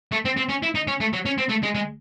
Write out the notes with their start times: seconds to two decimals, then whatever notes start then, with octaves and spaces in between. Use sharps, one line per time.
0.12 A3
0.25 C4
0.37 C4
0.49 C#4
0.63 E4
0.75 D#4
0.87 C#4
1.00 A3
1.13 F#3
1.26 C#4
1.38 C4
1.49 A3
1.63 G#3
1.75 G#3